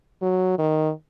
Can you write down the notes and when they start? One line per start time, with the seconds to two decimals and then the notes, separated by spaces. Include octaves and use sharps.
0.22 F#3
0.58 D#3